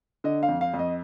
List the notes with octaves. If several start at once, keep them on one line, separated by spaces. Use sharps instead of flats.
D3 D#5
F5
F2
F5
F2
D#5